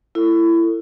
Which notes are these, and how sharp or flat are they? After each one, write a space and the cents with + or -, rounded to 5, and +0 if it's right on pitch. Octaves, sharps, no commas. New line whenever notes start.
E4 +20 A4 +35